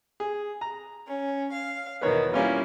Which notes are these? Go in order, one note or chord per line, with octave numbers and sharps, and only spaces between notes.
G#4
A#5
C#4
F5
E2 B2 D#3 B3 C#5
G3 A#3 C#4 E4 F4